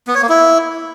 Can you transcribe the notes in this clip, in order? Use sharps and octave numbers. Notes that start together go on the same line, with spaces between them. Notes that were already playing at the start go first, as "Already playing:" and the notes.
B3
C#5
A#3
E4